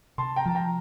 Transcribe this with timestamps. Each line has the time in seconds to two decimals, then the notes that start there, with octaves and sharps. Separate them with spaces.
0.18 C3 A5 C6
0.36 G5 A#5
0.46 F3 A5
0.55 G5 A#5